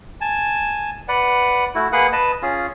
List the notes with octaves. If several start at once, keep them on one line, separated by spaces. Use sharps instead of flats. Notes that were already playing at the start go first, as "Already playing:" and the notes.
G#5 A5
B4 D5 F#5
A3 E4 F#4
A#3 G#4 B4 F#5
B4 D#5 A5
C#4 F4 G#4